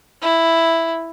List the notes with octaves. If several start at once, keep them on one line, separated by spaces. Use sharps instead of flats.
E4